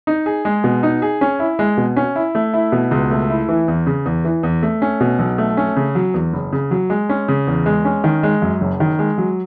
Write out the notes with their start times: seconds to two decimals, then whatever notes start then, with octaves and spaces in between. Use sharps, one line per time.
0.07 D#4
0.26 G#4
0.45 G#3
0.64 B2
0.83 D#4
1.02 G#4
1.21 C#4
1.40 E4
1.59 G#3
1.77 B2
1.96 C#4
2.16 E4
2.35 A3
2.53 E4
2.72 B2
2.91 C#2
3.11 A3
3.30 E4
3.49 E3
3.68 E2
3.87 C#3
4.06 E2
4.25 E3
4.43 E2
4.63 A3
4.82 C#4
5.00 B2
5.19 B1
5.38 A3
5.57 C#4
5.76 C#3
5.95 F#3
6.14 E2
6.33 F#1
6.53 C#3
6.71 F#3
6.90 G#3
7.09 C#4
7.28 C#3
7.47 E2
7.66 G#3
7.85 C#4
8.04 D#3
8.23 G#3
8.42 F#2
8.61 F#1
8.80 D#3
8.99 G#3
9.18 F#3